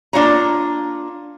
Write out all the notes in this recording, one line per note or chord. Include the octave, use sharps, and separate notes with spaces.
A#3 D4 F4 C#5 A#5